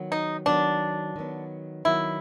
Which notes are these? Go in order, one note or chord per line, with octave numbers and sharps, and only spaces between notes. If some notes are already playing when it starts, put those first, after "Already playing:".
Already playing: D#3 F#3 B3
D#4
D#3 F#3 B3 D4
D#3 F#3 B3
D#3 F#3 B3 E4